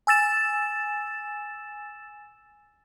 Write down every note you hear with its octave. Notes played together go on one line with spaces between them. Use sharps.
G#5 E6 A6 E7